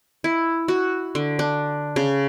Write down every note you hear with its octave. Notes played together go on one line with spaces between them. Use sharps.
E4
F#4
D3
D4
C#3